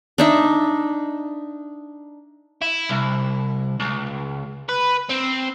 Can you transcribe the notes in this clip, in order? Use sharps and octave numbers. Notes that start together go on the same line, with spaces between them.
D4 D#4 E5
E4
C2
C#2
B4
C4